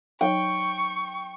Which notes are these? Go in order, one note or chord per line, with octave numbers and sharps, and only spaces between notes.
F#3 D#4 C#5 G5 C#6